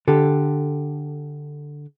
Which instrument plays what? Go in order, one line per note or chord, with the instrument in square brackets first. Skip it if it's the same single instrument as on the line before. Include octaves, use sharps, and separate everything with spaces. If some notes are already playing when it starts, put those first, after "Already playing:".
[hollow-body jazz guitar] D3 G4 A4